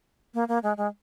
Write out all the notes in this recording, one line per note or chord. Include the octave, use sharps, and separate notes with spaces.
A#3
A#3
G#3
G#3